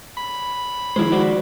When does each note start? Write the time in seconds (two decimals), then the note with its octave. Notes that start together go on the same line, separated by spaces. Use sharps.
0.17 B5
0.96 D#3 F3 G#3 E4 C5
1.12 F#4 C5 D5